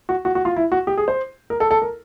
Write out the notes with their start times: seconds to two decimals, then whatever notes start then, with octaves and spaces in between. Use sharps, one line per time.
0.09 F#4
0.25 F#4
0.35 F#4
0.45 F4
0.56 E4
0.72 F#4
0.87 G4
0.97 G#4
1.08 C5
1.50 A#4
1.60 A4
1.71 A4
1.82 A#4